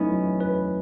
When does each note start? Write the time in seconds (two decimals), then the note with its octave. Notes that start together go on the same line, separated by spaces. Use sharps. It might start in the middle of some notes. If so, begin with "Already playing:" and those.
Already playing: F#3 A3 B3 C#4 D#4 E4
0.12 F#3
0.40 B4